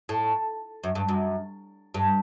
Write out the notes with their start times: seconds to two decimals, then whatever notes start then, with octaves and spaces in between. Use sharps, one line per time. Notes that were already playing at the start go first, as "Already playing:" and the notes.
0.09 A2
0.84 F#2
0.95 G2
1.09 F#2
1.94 G2